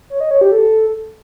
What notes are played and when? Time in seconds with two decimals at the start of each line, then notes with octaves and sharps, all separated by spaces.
0.10 C#5
0.20 D#5
0.31 C#5
0.41 G4
0.52 A4